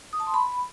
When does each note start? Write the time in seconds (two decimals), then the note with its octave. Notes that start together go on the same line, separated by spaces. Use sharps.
0.13 D#6
0.20 A5
0.27 C6
0.34 B5